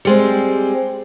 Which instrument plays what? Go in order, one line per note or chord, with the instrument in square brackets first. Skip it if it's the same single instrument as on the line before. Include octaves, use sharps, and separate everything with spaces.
[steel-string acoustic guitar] G3 G#3 C4